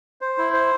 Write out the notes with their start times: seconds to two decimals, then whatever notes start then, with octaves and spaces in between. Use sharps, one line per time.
0.21 C5
0.38 E4
0.53 C5